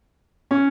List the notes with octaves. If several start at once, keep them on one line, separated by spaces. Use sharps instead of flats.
C#4